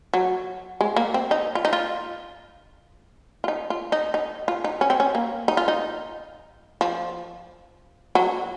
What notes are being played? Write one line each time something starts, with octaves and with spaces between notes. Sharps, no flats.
F#3
G#3
A#3
C4
D#4
F4
D#4
F4
F4
D#4
F4
D#4
D#4
F4
D#4
C#4
C4
C#4
A#3
D#4
F4
D#4
F3
F#3